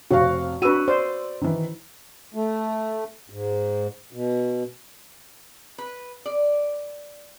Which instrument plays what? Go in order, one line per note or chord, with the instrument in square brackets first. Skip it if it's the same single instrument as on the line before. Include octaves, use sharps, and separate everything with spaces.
[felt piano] F1 C3 F5 [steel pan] F#4
[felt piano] D4 E6 D#7 [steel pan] F#4 B4
[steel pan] C5 [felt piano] D5
[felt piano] D#3 E3
[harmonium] A3
G#2
B2
[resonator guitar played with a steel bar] B4
D5